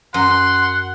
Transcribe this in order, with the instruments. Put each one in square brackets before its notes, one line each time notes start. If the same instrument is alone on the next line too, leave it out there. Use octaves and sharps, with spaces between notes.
[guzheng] F#2 [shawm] F#5 [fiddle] C6